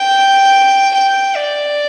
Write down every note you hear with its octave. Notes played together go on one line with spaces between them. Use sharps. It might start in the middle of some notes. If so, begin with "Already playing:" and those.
Already playing: G5
G5
D5